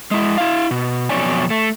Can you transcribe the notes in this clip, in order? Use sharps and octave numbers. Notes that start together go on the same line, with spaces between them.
G#3 E4
E4 F5
B2
F2 B2 F#3 C#5 D5 G#5
A3